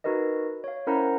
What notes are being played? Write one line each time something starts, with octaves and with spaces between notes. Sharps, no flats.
D#4 F#4 A#4 B4 D#5
C#5 F5
C#4 E4 A#4 C5 F#5 A#5